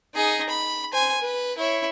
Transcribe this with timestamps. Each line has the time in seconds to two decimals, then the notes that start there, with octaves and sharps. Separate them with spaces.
0.15 D#4 G#4
0.49 B5
0.92 C5 G#5
1.21 B4
1.58 E4 C#5